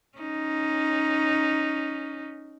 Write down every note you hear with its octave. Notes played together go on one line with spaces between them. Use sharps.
C#4 D#4